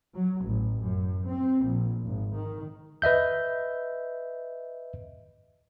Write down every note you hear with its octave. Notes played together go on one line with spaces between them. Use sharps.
F#3
A1
F#2
C4
A#1
G#1
D#3
B4 D#5 E5 G6